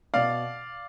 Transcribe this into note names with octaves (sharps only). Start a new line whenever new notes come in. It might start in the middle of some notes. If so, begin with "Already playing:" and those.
B2 D5 F5